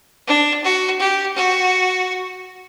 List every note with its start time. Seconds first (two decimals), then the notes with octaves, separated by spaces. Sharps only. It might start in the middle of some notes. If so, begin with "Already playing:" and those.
0.27 D4
0.64 F#4
1.00 G4
1.36 F#4